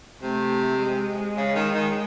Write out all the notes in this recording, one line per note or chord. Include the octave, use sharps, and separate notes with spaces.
C3 A3
G#3
C#3
D#3
D#3